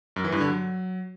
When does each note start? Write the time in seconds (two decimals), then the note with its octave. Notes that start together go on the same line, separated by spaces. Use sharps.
0.16 F#2
0.24 E3
0.32 G2
0.40 D3
0.48 F#3